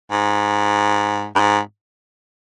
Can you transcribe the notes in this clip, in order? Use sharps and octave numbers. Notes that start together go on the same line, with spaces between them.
G#2
G2
G#2